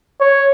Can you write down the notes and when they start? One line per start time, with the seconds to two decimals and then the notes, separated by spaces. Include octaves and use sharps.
0.21 C#5